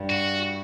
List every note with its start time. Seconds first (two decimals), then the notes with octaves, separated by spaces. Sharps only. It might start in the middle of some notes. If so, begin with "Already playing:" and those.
Already playing: G2
0.10 F#4